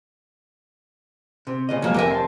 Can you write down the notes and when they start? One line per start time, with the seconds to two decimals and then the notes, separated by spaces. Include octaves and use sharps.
1.47 C3
1.69 A#2 C#3 D#5
1.82 F1 F3 F#3 G#3 A#3
1.94 F2 G4 A#4 E5 G#5
2.11 F2 A5 C6